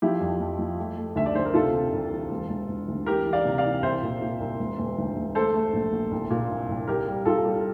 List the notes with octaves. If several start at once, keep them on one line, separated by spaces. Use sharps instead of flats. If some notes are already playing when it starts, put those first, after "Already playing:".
F3 E4 G4
F2
F2
F3
A3
A3
D2 E5
D5
D2 C5
A#4
C3 F4 A4
C3
C2
E3
E1
E1
E1
D2
E3 G4 A#4
E3
D5 F5
C3
D5 F5
E3
C2 C5 E5
A#2
A#2
C2
E1
E1
D2
E1
A3 A4 C5
A3
A#1
A#1
C2
A#2
C2
C2
C2 G4 A#4
G3
C2 F4 A4
G3